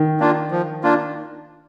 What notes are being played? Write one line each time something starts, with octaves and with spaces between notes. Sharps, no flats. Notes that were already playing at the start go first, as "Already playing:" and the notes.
Already playing: D#3
A#3 D4 F4
F3
A#3 D4 F4